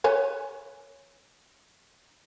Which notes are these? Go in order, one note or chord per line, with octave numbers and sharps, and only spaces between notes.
B4 C#5 G#5